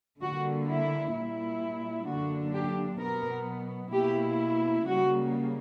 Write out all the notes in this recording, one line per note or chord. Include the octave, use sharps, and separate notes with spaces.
D3 G3 A#3 F#4
E4
A#2 G3 A#3 E4
F#2 D3 A#3 D4 F#4
G4
B2 F#3 B3 A#4
B2 A#3 E4 G4
C#3 G3 A#3 F#4